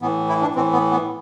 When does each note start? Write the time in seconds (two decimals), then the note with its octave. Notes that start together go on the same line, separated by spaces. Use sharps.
0.01 A2 E3 B3
0.29 E4
0.42 D4
0.55 A2 E3 C4
0.73 B3
0.91 B3